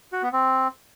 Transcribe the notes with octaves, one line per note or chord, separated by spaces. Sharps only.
F#4
B3
C4